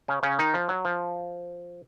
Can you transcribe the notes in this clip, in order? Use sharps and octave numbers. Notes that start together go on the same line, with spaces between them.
C#3 C#4
C#3 C#4
D#3 D#4
F3
F#3
F3